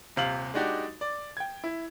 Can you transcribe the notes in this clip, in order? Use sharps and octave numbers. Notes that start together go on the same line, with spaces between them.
D#1 C3 F5 F#7
G#3 D4 D#4 F#4 G4
D5
G5 G#6
E4